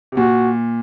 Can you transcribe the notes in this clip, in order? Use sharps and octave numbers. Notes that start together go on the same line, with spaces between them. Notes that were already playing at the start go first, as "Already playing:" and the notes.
C3
A#2 F#4